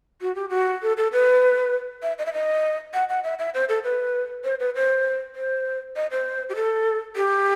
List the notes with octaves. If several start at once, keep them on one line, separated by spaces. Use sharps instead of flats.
F#4
G4
F#4
A4
A4
B4
E5
D#5
E5
D#5
F#5
F#5
E5
E5
C5
A4
B4
C5
B4
C5
C5
D#5
C5
G4
A4
G4